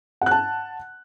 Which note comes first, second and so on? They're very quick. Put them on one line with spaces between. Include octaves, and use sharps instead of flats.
F#5 F#6 A5